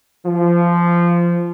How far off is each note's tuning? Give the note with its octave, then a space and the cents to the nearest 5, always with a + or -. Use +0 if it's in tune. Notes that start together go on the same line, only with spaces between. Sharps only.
F3 -15